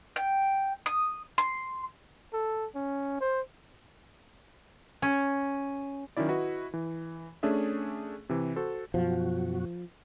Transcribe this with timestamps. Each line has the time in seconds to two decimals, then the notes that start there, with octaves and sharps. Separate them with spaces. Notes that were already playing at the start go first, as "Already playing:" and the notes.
0.16 G5
0.86 D#6
1.38 C6
2.33 A4
2.75 C#4
3.21 C5
5.02 C#4
6.17 D#3 F#3 C#4 E4 D5
6.29 E4 F#4 B4 D#5
6.74 E3
7.43 A3 C#4 D4 G#4 E5
8.29 C3 E3
8.56 F#4 A4 C5
8.94 F#2 B2 F3 F#4